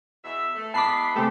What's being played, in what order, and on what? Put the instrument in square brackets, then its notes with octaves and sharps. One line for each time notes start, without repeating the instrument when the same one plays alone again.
[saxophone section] E2 B2 E5
A3
[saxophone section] E3 G#3 B3 [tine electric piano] A5 B5 D6 [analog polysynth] B6 C7
[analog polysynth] C3 G#3 A3 [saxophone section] G4